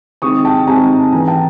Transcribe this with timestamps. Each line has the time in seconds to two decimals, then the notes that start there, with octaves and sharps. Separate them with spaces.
0.22 D#3 G#3 C4 C#6 D#6
0.45 G5 A5
0.67 D#3 G#3 C4 G#5 A#5
1.12 E3 A3 C#4 G#5 A#5
1.28 G5 A5